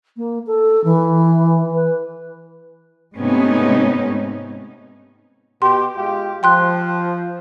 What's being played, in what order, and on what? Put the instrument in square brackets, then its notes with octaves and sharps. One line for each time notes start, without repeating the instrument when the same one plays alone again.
[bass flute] A#3
A4
E3
B4
[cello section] G#2 C3 A3 B3 C#4 D#4
[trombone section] B2 G4 [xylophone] C6
[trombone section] G#3 F4 G4
[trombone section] F3 [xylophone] G5 C6 F#6